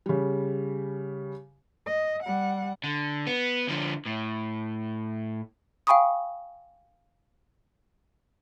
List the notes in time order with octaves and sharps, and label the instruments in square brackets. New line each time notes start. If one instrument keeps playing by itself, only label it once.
[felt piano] C#3 G3
[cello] D#5
G3 F#5
[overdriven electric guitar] D3
B3
D3 F3
A2
[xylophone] F5 G5 G#5 B5 C#6 D#6